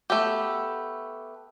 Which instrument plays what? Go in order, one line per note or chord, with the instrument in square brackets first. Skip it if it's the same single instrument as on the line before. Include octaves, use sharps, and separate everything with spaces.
[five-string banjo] A3 B3 G4